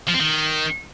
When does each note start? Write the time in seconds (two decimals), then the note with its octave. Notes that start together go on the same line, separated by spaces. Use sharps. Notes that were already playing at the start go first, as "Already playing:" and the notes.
0.08 F3
0.14 C4
0.20 D#3